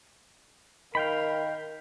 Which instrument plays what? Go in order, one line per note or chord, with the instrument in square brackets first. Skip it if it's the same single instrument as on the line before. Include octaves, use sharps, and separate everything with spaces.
[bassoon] D#3 [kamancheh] A#4 [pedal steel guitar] F5 G5 B5